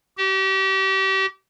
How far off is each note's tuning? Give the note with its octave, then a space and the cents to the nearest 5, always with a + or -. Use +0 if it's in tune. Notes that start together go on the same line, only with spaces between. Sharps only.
G4 -35